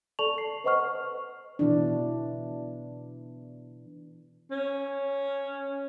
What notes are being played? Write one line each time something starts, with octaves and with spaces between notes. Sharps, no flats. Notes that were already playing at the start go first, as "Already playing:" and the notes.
A4 D5 A5 C#6 F7 F#7
C7
B4 C5 D#5 F#5 C#6 F6
B2 E3 D4
C#4